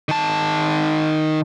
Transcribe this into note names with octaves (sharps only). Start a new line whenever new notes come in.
D#3 A5